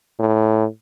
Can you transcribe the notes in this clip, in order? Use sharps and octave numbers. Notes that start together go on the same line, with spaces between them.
A2